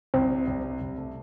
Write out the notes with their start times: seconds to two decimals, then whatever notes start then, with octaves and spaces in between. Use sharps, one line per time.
0.14 C2 C4
0.30 C3
0.47 C2
0.64 C3
0.81 C2
0.97 A3